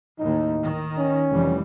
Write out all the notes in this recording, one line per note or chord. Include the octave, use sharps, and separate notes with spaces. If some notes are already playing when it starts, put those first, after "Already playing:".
D#2 A2 D#4
D#3
C#4
F1 E3 G3